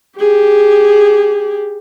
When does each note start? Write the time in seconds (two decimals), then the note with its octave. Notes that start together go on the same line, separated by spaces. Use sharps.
0.18 G4 G#4